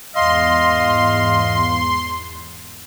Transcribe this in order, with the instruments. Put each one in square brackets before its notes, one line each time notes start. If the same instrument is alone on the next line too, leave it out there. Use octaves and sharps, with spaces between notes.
[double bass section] E2 G#2 [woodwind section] D#5 F5 [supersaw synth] C6